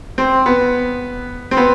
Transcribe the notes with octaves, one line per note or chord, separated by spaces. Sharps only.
C4
B3
C4
B3